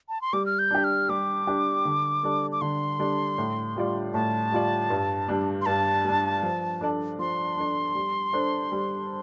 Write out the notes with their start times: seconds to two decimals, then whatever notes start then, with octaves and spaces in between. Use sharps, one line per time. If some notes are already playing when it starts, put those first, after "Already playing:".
0.09 A5
0.21 C6
0.33 G3 D6
0.46 F6
0.59 G6
0.71 D4 G4
0.84 F6
1.09 G3 D6
1.47 D4 G4
1.85 D3
2.23 G3 D4 A4 D5
2.52 D6
2.61 D3 C6
2.99 G3 D4 A4 D5
3.38 A2
3.76 G3 F4 D5
4.14 A2 A5
4.52 G3 F4 D5
4.90 G2
5.28 G3 D4
5.61 C6
5.66 G2 A5
6.05 G3 D4
6.43 F3
6.81 D4 A4 D5
7.19 F3 C6
7.57 D4 A4 D5
7.95 G3
8.33 D4 A4 C5
8.72 G3